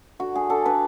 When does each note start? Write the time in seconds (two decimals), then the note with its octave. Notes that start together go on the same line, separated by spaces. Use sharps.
0.19 D3 F#4
0.34 D3 G#4
0.50 D4 A4
0.66 D4 B4